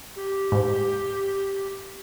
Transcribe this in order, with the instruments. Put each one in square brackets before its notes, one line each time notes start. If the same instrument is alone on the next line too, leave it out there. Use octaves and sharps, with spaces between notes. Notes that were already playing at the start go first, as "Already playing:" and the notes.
[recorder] G4
[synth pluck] G#2